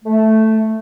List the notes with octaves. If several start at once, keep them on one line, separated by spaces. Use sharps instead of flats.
A3